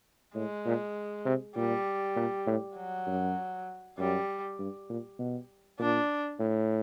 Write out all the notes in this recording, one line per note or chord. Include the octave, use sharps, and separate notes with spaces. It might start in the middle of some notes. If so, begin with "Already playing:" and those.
A2 G#3
A#2
C3
A#2 G3
A#2
A2
F#3
F#2
F#2 G3
G2
A#2
B2
A#2 D4
A2